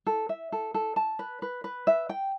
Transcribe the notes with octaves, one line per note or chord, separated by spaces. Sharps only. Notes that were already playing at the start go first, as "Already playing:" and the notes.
A4
E5
A4
A4
A5
B4
B4
B4
E5
G5